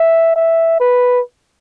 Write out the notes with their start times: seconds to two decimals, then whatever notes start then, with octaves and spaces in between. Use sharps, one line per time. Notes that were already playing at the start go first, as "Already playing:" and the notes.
Already playing: E5
0.36 E5
0.80 B4